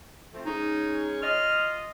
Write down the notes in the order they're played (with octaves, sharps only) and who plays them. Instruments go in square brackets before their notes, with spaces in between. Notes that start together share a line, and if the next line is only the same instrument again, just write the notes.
[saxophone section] F3 A3 C4
[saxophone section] G#3 C#4 [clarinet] D#4
[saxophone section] F4 D#5 [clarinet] F6